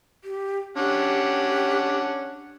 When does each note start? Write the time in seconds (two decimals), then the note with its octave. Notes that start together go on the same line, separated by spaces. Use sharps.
0.24 G4
0.77 C#4 D4 G4 F#5